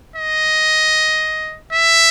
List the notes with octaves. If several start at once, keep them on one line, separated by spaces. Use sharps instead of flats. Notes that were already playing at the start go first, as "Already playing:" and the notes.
D#5
E5